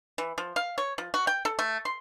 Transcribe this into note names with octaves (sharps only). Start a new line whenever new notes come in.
E3
F3
F5
C#5
F3
F#4
G5
A4
A3
C6